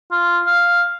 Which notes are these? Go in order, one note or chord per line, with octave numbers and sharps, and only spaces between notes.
F4
F5